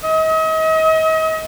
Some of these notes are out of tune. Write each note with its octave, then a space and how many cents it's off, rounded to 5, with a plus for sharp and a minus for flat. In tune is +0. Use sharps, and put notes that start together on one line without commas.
D#5 +40